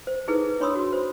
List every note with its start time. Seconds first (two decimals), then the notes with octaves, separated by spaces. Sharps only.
0.07 C5
0.28 D#4 E4 G#4 A4 B4
0.60 D4 C#5 B5 C6 D#6 E6
0.76 F#4
0.93 C5